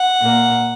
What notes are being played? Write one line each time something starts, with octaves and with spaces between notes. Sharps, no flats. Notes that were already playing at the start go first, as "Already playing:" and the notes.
Already playing: F#5
A#2 A#3